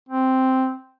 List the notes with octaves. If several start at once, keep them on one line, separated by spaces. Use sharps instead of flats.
C4